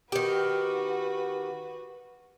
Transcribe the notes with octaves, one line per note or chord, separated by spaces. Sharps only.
D#3 F#4 G4 B4